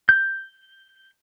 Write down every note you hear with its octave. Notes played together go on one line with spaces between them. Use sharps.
G6